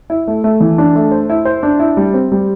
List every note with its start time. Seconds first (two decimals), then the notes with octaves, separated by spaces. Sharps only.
0.10 E4
0.28 A3
0.44 A3
0.60 E3
0.78 D4
0.95 A3
1.11 C5
1.30 E4
1.45 C5
1.63 D4
1.79 E4
1.97 G3
2.14 C4
2.32 G3